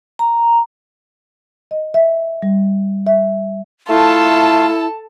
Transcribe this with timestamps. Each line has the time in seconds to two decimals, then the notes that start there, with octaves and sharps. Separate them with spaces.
0.19 A#5
1.71 D#5
1.94 E5
2.42 G3
3.07 E5
3.89 A3 E4 F4 A4 A5